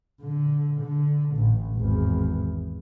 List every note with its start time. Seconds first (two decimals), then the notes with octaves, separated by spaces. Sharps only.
0.21 D3
0.81 D3
1.36 A1
1.76 G#1 E2